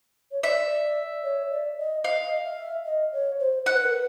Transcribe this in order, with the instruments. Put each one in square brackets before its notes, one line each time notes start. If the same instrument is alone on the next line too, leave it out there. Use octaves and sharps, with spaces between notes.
[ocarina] C#5
[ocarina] D5 [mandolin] E5
[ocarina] C#5
D5
D#5
[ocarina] D#5 [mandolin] F5
[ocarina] E5
D#5
C#5
C5
[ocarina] C5 [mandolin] F#5
[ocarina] B4
A#4
B4